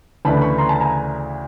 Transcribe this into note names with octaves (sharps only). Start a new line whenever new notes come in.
D2 C#3 E3 A3 D4 A5 B5
B5 C#6
A#5 C6
A5 B5
G#5 A#5